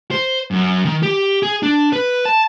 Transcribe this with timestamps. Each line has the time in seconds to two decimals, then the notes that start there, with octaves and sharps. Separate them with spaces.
0.11 C5
0.51 F#2
0.85 D#3
1.03 G4
1.43 G#4
1.63 D4
1.93 B4
2.25 A5